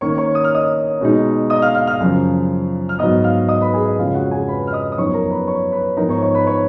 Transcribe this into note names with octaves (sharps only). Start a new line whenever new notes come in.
D#3 A#3 C#4 C#5 C#6
C#5 C#6
D#6
F6
D#5 D#6
B2 G#3 D#4
D#5 D#6
F5 F6
F5 F6
F5 F6
F#2 C#3 F3
F6
G#2 F#3 B3 D#5 D#6
F5 F6
D#5 D#6
B4 B5
G#4 G#5
D#5
F2 C#3 G#3 C#4 F4 F5
F#4 F#5
G#4 G#5
B4 B5
F6
D#5 D#6
D#6
F#2 F3 B3 D#4 C#5 C#6
A#4 A#5
B4 B5
C#5 C#6
B4 B5
G#2 F3 B3 D#4 A#4 A#5
C#5 C#6
C#5 C#6
B4 B5
C#5 C#6